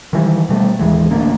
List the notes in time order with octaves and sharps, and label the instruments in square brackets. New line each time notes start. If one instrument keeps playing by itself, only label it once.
[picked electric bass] D#3 E3 G3
B2 G3 A3
A1 D#2 E3 G#3
A1 D2 A#3 D4